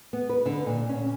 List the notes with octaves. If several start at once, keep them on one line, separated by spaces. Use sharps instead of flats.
B3
B4
D3
A#2
C#4